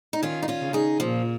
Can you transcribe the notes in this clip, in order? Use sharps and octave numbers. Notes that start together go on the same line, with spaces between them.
D#4
D#3 C#4 F4
D#4
C#4 F4
C#3
D#4 G#4
A#2 F3